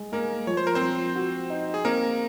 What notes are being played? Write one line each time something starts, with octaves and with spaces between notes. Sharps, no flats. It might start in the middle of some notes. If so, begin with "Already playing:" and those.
Already playing: G#3
G#3 A#3 A#4
F3 C#5
C5
A#4
C4 C5
F3
F#4
D#4
G#4
A#3 C4 A#4